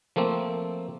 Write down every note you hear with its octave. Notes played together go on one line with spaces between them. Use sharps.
F3 A3 A#3 C4